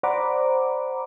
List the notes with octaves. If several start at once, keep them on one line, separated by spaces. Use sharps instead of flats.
C5 D5 F#5 A#5 B5 D6